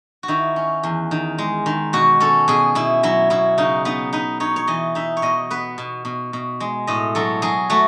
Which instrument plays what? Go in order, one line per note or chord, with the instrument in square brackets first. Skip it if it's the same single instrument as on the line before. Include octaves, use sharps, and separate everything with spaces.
[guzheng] F#4
D#3 E4
C#4
E2
D#3
G#3
D#3
B2 F#4
C#4 A4
B2 G#4
B2 E4
F#3 E4
B2 E4
C#3 D#4
B3 D#4
D#4 B4
D#4 C#5
C#5
E3 D#5
D#4 E5
C#5
B2 D#5
B3 B4
B2
B2
B2
G#3
A2 D#5
F#3 A4
F#3 G#4
A3 F#4